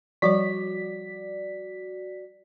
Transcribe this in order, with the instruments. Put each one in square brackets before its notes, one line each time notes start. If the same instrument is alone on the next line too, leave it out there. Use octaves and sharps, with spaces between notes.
[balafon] F3 G3 C#5 [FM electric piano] F#4 D5 B6